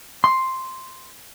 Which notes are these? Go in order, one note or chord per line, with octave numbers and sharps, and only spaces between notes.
C6